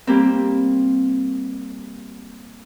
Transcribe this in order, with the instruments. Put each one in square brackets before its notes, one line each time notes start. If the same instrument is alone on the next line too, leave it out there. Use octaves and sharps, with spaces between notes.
[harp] G3 A#3 C4